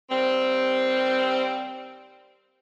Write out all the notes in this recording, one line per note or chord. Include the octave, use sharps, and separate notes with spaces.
D#2 G3 C4